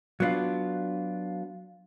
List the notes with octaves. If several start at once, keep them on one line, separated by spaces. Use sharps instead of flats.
F#3 B3 D4 F4